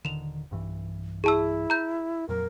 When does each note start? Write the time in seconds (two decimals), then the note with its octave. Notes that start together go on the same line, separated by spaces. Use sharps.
0.05 D#1 D3 D#3 E7 F7
0.51 B1 G2 E3
1.24 E4 G#4 A5 E6
1.70 A#5 G6
2.29 F2 A#2 F#3 A#4